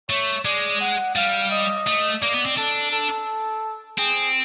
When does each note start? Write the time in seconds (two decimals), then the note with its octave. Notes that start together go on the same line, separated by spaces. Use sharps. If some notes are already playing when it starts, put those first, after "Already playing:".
0.10 A3 C#5
0.45 G#3 D5
0.81 F#5
1.16 G3 F5
1.51 D#5
1.87 A3
2.22 A#3 D5
2.34 B3
2.46 C4
2.57 D4 A4
2.92 A4
3.98 C4 G#4